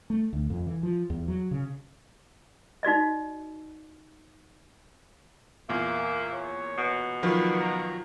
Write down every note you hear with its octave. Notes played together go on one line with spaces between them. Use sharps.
A3
D2
F2
E3
F3
E2
F#3
C#3
D#4 F#4 D5 D#5
E2 A#2 A#3 E5
C#5
B2
D#3 F3 F#3 B4
A#5